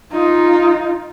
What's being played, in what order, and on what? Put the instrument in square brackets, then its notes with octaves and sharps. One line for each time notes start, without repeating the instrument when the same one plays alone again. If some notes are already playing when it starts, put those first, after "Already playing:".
[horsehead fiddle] D#4 F4